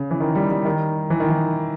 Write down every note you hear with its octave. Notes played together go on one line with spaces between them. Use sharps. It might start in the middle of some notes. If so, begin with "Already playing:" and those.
Already playing: C#3
E3
D#3
G3
G3
D#3
E3
D#3
E3